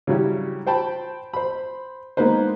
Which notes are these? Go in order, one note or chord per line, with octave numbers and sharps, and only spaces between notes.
C#3 F#3 G3 C#4 E4
C5 G5 A5 B5
C5 B5
G#3 A#3 B3 D#4 B4 C5